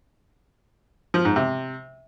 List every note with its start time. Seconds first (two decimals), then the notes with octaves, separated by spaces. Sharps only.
1.14 F3
1.25 G#2
1.36 C3